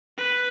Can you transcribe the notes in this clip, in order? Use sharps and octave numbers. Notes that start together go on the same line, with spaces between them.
B4